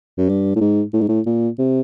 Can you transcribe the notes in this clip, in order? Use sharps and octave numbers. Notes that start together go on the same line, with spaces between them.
F#2
G2
A2
G#2
A2
G#2
A2
A#2
C3